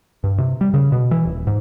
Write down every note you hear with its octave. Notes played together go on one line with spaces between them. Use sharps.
G2
C3
G3
C#3
B2
E3
D#1
G#2